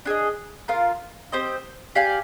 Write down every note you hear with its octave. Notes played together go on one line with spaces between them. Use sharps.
D4 G#4 D#5
F4 A#4 F5
C4 G4 C5 D#5
G4 D5 F5 G#5